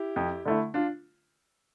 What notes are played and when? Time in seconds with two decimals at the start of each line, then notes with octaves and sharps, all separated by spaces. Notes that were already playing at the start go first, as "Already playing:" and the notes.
Already playing: E4 G4
0.16 F2
0.45 D3 A3 E4
0.74 D4 F4